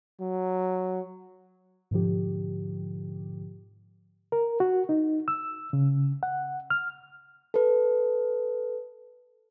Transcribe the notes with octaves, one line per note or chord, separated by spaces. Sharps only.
F#3
G#2 B2 D3 F3 G4
A#4
F#4
D#4
E6
C#3
F#5
F6
A4 B4